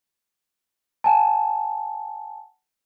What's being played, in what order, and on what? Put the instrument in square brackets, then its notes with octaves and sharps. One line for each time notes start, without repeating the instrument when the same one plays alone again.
[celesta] F#5 G#5 A5